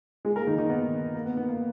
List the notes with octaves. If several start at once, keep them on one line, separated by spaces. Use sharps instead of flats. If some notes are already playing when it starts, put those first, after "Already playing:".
G#3 G#4
A#3 A#4
D#3 D#4
D#3 D#4
B3
A#3
B3
B3
A#3